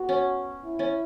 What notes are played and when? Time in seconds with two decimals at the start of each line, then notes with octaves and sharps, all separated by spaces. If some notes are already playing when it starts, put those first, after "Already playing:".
Already playing: B3 F#4
0.09 C#4
0.65 E4
0.79 C#4